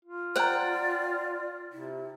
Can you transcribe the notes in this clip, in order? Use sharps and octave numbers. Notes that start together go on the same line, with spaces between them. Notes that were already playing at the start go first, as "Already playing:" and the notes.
F4
C5 D5 F#5 G5 A#5
C3 E4